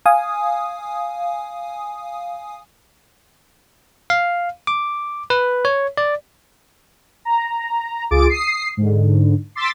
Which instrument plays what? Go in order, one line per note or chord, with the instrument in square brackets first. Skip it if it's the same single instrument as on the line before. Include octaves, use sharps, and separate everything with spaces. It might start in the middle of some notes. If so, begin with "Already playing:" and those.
[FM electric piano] F5 G#5 D#6
[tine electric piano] F5
D6
B4
C#5
D5
[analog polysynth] A#5
C#2 F4 G#4 D6 A6 D7
D#6 C7
G#2 D3
C6 D6 E6 A6 B6